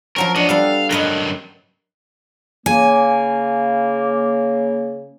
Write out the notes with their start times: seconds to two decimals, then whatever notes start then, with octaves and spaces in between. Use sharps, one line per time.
0.16 F3 F#3 C#4 A#4
0.36 D4 D#5 F#5
0.49 G3 B3 A4 F5
0.91 G2 F#3 A#4 B4 D#5
2.66 C#3 A#3 G#5